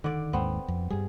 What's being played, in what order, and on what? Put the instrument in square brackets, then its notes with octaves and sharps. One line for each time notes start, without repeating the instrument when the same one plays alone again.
[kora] D3 D5 [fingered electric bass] D#3
[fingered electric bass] D#2 G#2 [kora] B3 C4
[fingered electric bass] F2
[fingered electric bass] G2 G3 [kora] G#4